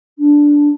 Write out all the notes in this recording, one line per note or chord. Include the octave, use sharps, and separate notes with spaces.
D4